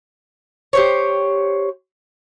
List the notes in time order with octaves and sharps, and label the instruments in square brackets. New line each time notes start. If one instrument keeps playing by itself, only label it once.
[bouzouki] G4 C5 C#5